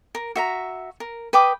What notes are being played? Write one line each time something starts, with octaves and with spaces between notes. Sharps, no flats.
A#4
F#4 E5 A#5
A#4
B4 G5 D6 D#6